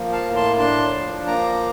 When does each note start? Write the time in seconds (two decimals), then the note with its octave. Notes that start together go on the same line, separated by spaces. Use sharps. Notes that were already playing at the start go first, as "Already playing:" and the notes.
Already playing: F3 A#3
0.12 F5 A5
0.25 A2
0.36 A5 C6
0.58 D4 A5 C6
0.93 F3
1.27 A#3 A#5 D6